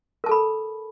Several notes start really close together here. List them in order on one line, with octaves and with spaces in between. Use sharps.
A#4 A5 A4 B5